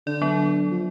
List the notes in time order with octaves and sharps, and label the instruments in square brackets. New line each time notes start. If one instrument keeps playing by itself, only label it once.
[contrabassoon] D3 [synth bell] D5
[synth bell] F#3 B3
[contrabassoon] F3